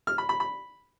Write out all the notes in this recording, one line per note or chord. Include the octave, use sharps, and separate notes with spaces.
F6
B5
B5
B5